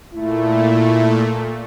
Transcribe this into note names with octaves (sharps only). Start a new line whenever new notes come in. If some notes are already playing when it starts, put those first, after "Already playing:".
A#2 A3 E4